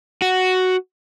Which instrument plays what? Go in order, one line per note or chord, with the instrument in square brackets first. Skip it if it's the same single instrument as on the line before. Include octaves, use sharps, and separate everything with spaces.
[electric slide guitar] F#4